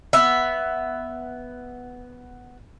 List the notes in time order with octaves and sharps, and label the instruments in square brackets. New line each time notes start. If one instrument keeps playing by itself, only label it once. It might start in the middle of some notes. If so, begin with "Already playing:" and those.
[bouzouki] B3 E5